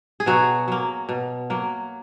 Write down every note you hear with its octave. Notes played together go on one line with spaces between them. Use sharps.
G#4
B2 F#3 F#4
F#3 A#3
B2
F#3 A#3